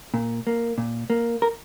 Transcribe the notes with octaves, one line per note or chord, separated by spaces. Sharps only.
A#2
A#3
A#2
A#3
A#4